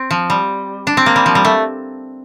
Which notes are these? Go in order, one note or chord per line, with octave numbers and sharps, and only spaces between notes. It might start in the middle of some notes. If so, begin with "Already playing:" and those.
Already playing: C4
F3
G3
D4
C4
A#3
G3
F3
G3
A3